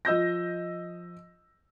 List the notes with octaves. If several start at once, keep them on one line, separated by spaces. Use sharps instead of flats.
F3 D#5 E6 G6 A#6